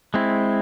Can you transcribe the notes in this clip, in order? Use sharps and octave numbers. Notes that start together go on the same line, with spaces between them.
G#3 C4 E4